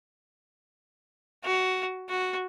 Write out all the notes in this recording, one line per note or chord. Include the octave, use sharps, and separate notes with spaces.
F#4
F#4